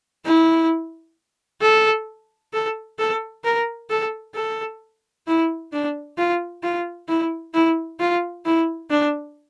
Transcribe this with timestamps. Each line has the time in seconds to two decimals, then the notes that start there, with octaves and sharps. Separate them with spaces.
0.25 E4
1.61 A4
2.53 A4
2.99 A4
3.44 A#4
3.90 A4
4.35 A4
5.27 E4
5.72 D4
6.18 F4
6.63 F4
7.08 E4
7.54 E4
8.00 F4
8.45 E4
8.90 D4